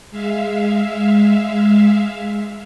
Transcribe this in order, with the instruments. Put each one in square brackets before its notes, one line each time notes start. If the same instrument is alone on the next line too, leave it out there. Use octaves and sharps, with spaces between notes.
[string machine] G#3 E5 F5